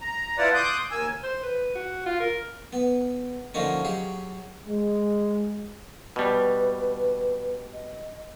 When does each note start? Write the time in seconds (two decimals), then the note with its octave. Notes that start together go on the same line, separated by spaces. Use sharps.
0.01 A#5
0.38 E4 F4 B4 D5 F#5 A5
0.54 C6 D6 D#6 F#6 G6
0.91 D#2 A#3 G#5 E6
1.23 C5
1.43 B4
1.75 F#4
2.06 F4
2.20 A#4
2.73 B3
3.54 D3 F3 A#3 C#4 D#4
3.85 F#3 G4 G#4
4.66 G#3
6.16 B2 G3 B4
7.72 D#5